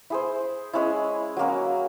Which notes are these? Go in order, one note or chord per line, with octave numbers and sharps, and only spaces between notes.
E4 G#4 C5
G#3 C#4 E4
F#3 A#3 C#4